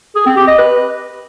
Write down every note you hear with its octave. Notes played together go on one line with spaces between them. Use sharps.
G#4
C4
G4
D#5
B4